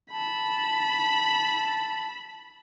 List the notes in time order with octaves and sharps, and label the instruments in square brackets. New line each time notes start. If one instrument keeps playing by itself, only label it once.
[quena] A5 [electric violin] B5